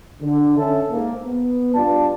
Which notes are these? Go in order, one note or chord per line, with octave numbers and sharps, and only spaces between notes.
D3
C#4 A4 E5
G#2 A#3
B3
G2 D4 F4 D5 A5